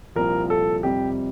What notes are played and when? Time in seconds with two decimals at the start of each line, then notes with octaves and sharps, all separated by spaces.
0.15 C2 A#2 F3 A#4
0.50 A4
0.83 F2 C3 G3 G4